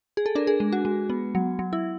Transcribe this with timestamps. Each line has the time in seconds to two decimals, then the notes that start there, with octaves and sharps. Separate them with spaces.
0.17 G#4
0.26 A4
0.35 D4 A#4
0.47 G#4
0.60 G#3
0.73 F#4
0.85 G#3
1.10 B3
1.35 F#3
1.59 F#3
1.73 E4